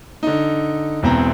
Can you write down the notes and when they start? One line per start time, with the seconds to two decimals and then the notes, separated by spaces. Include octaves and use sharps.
0.23 D3 D#4
1.03 E1 E2 C4 A#5